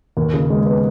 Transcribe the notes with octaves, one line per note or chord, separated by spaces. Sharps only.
D#2
C#3
G#3
B3